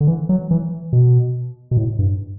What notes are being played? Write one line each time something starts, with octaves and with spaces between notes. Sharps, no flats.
D3
E3
F#3
E3
B2
B2
A2
G2